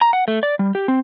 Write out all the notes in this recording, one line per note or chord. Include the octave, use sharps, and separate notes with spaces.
A#5
F#5
A3
D5
G3
G4
C4